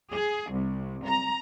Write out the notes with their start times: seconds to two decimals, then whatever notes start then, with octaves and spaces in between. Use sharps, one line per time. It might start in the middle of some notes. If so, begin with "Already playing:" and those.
0.11 G#4
0.52 C2
1.05 A#5